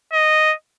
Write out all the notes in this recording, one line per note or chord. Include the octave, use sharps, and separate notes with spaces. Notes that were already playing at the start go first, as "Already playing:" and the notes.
D#5